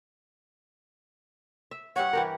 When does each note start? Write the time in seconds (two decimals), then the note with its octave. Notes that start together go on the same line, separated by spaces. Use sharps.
1.71 E5
1.96 G2 G4 C#5 F#5
2.13 E3 G4 A#4